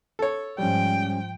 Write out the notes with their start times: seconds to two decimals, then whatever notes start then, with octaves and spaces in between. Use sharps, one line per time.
0.19 A4 C#5
0.58 G#2 F3 G3 C#4 G5